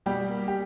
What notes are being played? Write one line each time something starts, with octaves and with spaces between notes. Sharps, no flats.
B2 G3 G4
A#3
G4